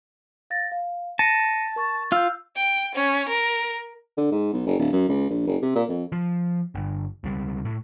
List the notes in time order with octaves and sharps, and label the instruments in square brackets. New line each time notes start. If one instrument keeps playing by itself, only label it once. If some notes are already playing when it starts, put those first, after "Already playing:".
[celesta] F5 A6 A#6
F5
[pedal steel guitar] A5 [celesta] A#6 C#7 D#7
[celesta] A#4 C#6 A6
[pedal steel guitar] F4 F5 [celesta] E6 G6
[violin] G5
C#4
A#4
[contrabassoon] D3
G#2
B1
F#1
D1
F#2
C#2
A#1
F#1
C3
A#2
F2
[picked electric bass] F3
G1
C#2 G3
A2